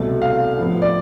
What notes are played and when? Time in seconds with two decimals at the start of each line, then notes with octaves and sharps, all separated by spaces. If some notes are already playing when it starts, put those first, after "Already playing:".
Already playing: C2 B2 A3
0.22 F5
0.58 A2 F3 B3
0.82 D5